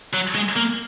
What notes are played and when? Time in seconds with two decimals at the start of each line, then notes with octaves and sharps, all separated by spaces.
0.14 F#3
0.35 G#3
0.56 A#3